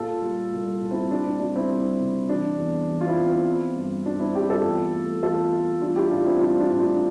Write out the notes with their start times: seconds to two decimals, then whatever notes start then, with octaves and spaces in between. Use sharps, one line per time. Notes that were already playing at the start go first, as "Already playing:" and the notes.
Already playing: A#2 F4 A4
0.22 G3
0.52 C2
0.82 A#2
0.91 C4 E4
1.11 G3 D4
1.26 C4
1.40 C2 D4
1.56 C4 E4
1.70 G3
1.99 C3
2.29 E3 D4
2.58 E2
2.88 E3
3.01 F4
3.07 C4 E4
3.17 E2
3.27 C4
3.46 E3
3.76 G2
4.05 G2 D4
4.19 C4 E4
4.35 G2 E4 G4
4.50 F4 A4
4.65 E2
4.94 A3
5.23 E2 F4 A4
5.52 A3
5.81 G3 D4 F4
5.96 E4 G4
6.11 A2 D4 F4
6.25 C4 E4
6.41 G3 D4 F4
6.60 D4 F4
6.70 A2
6.80 D4 F4